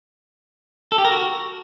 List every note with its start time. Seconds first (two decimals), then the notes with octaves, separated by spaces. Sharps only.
0.92 A4
0.98 G4
1.05 A#4
1.11 F#4